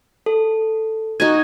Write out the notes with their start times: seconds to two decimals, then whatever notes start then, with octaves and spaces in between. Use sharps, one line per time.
0.26 A4
1.20 D#4 F#4 G#5 G#6